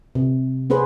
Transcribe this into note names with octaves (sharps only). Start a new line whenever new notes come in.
C3
B3 C#4 G#4 B4 C5